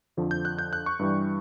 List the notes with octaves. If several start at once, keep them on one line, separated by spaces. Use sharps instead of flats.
F2 D3 F3
G6
F#6
G6
F#6
C#6
G2 E3 G3